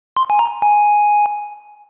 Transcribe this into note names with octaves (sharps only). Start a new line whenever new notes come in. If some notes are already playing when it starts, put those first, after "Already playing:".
C6
G#5
A#5
G#5